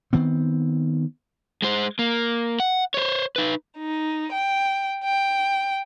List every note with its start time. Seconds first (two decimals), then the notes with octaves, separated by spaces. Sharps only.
0.13 D#3 B3 C4
1.62 G#3 C5
1.99 A#3
2.60 F#5
2.94 C5 C#5
3.36 D#4 B4
3.78 D#4
4.32 G5
5.05 G5